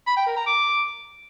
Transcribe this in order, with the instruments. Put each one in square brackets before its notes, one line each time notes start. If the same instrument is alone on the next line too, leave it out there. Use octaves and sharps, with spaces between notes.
[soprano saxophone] B5
G5
A#4
A#5
D6